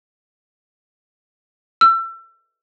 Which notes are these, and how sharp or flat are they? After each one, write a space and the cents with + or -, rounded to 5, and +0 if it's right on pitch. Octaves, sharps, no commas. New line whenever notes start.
E6 +30